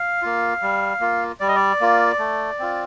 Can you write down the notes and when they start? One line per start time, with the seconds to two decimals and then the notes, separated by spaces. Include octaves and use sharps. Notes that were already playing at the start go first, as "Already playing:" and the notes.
Already playing: F5
0.22 A#3 F4
0.62 G3
1.00 A#3 F4
1.40 G3 D5
1.48 D#5
1.56 D5
1.80 A#3 F4
2.19 A3
2.59 C4 F4